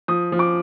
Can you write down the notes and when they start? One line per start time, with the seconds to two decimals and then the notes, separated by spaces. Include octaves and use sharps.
0.08 F3 D#6
0.32 F3
0.39 D6